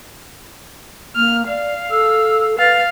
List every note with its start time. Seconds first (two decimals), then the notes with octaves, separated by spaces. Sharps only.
1.16 A#3 F6
1.47 D5 F5
1.90 A4 E6
2.59 B4 F5 A6